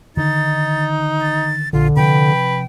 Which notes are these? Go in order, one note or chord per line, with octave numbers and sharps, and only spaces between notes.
D3 D#3 D#4 A6
A6
A#1 D3 F4
C3 F3 B4 G5